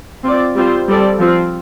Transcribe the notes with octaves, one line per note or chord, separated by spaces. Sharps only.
C4 F4 D5
G3 C4 F4 C5
G3 C4 A4 D5
F3 C4 F4